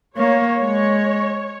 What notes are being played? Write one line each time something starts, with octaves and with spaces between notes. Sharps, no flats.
A#3 C#5
G#3 C#5